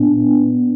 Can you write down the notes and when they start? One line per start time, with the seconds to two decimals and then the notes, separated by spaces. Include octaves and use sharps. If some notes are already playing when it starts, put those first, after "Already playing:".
Already playing: A#2 B3 D4